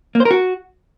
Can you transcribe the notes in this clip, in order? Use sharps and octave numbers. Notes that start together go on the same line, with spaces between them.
A#3
C5
A#4
F#4